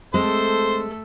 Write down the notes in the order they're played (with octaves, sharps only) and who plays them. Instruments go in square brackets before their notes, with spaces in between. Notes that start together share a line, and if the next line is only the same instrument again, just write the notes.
[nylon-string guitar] G#3 C4 [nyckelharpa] A3 A4 [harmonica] C5